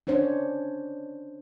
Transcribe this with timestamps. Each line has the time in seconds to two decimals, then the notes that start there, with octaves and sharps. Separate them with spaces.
0.07 C#4 D4 C5 C#5